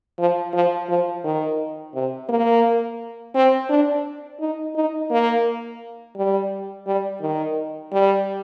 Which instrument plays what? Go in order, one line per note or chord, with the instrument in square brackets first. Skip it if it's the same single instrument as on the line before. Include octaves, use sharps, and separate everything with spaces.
[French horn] F3
F3
F3
D#3
C3
A#3
C4
D4
D#4
D#4
A#3
G3
G3
D#3
G3